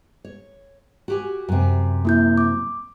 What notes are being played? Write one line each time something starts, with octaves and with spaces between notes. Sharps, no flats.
C#5
F#4 G4 G#5
F#2 C3
A#3 E4 G6
D6